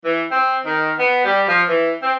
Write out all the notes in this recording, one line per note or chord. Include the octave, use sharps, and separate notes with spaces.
E3
C4
D#3
B3
G3
F3
E3
C4